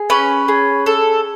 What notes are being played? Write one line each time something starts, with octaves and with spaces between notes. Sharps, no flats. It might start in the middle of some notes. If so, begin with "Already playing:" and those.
Already playing: G#4
C#4 B4
G#4
A4